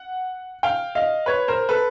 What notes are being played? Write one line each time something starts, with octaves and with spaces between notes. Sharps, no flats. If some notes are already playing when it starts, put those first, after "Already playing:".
Already playing: F#5
F5 G5
D#5 F5
B4 C#5
A#4 C5
A4 B4